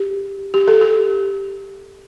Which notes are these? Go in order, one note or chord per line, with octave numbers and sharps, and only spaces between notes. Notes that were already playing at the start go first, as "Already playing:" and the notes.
Already playing: G4
G4
A4
G4